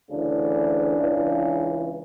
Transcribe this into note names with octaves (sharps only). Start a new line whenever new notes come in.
D2 C#3 E3 D4
C#2 C#3 E3